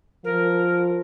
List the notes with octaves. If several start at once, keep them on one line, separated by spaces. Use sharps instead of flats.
F3 A#4